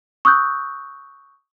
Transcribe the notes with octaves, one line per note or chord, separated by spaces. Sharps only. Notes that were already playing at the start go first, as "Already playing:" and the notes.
C#6 D#6 E6 F#6 G6